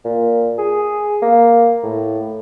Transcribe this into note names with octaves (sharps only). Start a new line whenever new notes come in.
A#2
G#4
A#3
A2